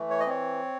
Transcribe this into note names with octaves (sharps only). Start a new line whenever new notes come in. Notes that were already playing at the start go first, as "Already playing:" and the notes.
Already playing: E3 A3
C#5
D#5
C4 C#5